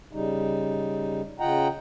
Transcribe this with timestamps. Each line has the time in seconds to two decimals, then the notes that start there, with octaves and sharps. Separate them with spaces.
0.13 C#3 G3 D#4
1.40 C#3 F4 D#5 F#5 G5 A#5